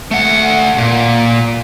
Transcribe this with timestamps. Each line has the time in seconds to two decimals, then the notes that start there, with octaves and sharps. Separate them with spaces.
0.11 A3 F#5
0.78 A#2